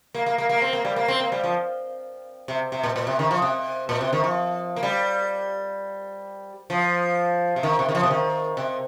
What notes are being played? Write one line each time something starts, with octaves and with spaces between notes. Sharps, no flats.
A#3
A#3
A#3
A#3
C4
A#3
G3
A#3
C4
A#3
G3
F3
C3
C3
A#2
A#2
C3
D#3
F3
C3
A#2
C3
D#3
F3
A#3
G3
F3
C3
D#3
C3
D#3
F3
C3
D#3
C3